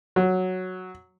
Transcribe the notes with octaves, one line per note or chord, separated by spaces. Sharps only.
F#3